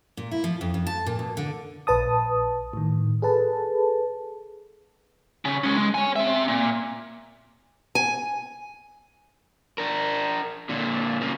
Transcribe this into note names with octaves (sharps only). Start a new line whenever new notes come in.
A#2
E4
F3
F2
F2
A5
A#2
B2
D3
A#1 B4 A5 D#6
A2 D#3
G#4 A4 B4 A5
C#3
G#3 C#4
G#3
C#5 G#5
C4 E5
A#2
G#5
D4 A#4
A#2 D3
C#3 A#3